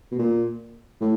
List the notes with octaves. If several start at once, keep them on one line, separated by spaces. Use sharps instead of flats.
B2
A#2
A2